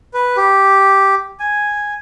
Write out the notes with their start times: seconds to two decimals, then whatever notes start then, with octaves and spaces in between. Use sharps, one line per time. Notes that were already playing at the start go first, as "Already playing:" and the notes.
0.14 B4
0.37 G4
1.40 G#5